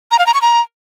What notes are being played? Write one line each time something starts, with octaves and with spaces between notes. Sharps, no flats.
A#5
F5
A#5
C#6
A#5